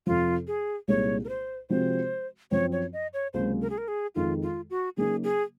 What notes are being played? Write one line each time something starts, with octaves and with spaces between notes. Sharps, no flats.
F2 C3 F3 F4
G#4
C2 A#2 G#3 D#4 G#4 C#5
A#4
C5
C3 F3 G#3 C4 F#4 C5
F#2 F3 C4 C#5
C#5
D#5
C#5
C#2 C3 F#3 A#3 C5
A#4
G#4
A#4
G#4
F2 D#3 G#3 F4
F4
F#4
C#3 F#3 A#3 D#4 G#4
G#4